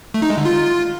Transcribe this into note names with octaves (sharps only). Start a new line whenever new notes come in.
A3
D#4
G#3
D3
F4